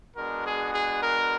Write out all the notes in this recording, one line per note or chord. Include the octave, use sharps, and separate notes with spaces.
G#3 B3 D4 F#4 A#4
G#4
G#4
A#4